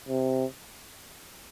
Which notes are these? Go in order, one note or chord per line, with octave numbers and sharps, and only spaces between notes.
C3